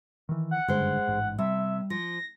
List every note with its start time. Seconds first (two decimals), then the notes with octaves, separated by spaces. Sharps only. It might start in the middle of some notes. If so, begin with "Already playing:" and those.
0.29 D#3 E3
0.51 F#5
0.68 F#1 G2 D3 G#3 C5
1.07 A1 G#2
1.39 C3 G3 E5
1.90 F3 A#6